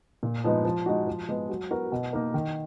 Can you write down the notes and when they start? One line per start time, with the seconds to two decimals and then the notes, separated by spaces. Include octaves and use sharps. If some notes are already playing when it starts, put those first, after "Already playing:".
0.23 A#2
0.44 F3 G#3 B3 D#4
0.65 F3
0.86 G#3 D#4 F#4
1.07 F3
1.29 G#3 B3
1.49 F#3
1.70 B3 F#4 A#4
1.92 B2
2.13 A#3 D#4 A#4
2.34 D#3